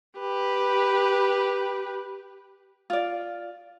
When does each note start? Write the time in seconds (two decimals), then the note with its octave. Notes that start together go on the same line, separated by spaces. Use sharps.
0.19 G4 B4
2.90 F4 D5